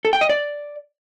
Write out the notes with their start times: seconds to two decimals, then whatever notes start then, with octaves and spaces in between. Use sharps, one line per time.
0.05 A4
0.13 G5
0.21 D#5
0.29 D5